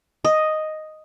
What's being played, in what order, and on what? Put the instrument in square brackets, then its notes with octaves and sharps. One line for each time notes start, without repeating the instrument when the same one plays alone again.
[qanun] D#5